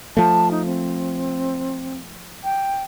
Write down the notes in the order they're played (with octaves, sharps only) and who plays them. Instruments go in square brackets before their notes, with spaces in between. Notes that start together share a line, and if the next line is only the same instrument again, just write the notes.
[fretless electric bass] F3 A3 [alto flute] A5
[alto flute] D#4
C4
G5